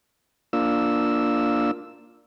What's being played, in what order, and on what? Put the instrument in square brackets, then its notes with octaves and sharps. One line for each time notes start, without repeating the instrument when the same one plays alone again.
[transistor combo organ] A#3 D4 F4 E6